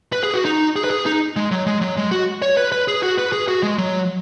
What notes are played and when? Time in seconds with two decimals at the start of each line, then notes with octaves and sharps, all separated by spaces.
0.12 B4
0.23 G#4
0.34 F#4
0.45 D#4
0.76 G#4
0.84 B4
0.90 G#4
1.06 D#4
1.36 G#3
1.51 F#3
1.67 G#3
1.81 F#3
1.97 G#3
2.11 F#4
2.42 C#5
2.57 B4
2.72 B4
2.88 G#4
3.03 F#4
3.18 B4
3.32 G#4
3.48 F#4
3.63 G#3
3.78 F#3